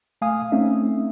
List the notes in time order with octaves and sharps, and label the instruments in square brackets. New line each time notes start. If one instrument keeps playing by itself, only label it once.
[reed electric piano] A3 F5 G#5 D#6
A3 C4 C#4 D#4 E5